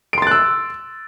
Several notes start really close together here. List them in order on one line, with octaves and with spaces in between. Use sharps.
D7 C6 A6 F#6 E6